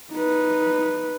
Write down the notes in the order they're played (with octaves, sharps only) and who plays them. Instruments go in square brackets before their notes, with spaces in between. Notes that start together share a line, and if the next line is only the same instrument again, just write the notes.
[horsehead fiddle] D#4 B4